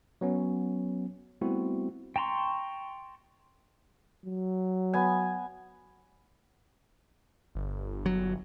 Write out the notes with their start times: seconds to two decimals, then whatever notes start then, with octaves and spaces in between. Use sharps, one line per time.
0.21 F#3 B3 C#4
1.41 G3 A3 B3 C4 E4 F#4
2.16 G5 A5 A#5 C6 C#6
4.25 F#3
4.93 B3 G#5
7.55 G1
8.06 F#3